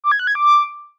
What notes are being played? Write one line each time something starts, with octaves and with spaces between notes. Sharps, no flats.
D6
G#6
F#6
G#6
D6